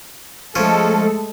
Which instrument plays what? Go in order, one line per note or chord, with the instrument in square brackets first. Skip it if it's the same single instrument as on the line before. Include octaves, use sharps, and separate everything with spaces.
[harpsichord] F3 C#4 C#5 [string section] G#3 A3 A4